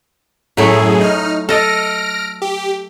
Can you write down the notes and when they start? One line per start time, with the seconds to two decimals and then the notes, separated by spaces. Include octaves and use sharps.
0.57 F#2 A2 F#3 A3 E4 G#4
1.01 D#4 F6
1.49 A4 D#5 F6 A#6 D7
2.42 G4